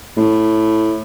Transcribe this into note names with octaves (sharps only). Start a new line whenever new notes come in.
A2